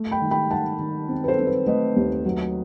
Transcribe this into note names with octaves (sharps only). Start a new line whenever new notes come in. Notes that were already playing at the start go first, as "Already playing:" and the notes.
Already playing: A3
G5 B5
D#3
G5 B5
D#3 F#5 A5
D#3
C4
B4
A4 C5
C4
B4
A3 B4 D#5
D#2
F#3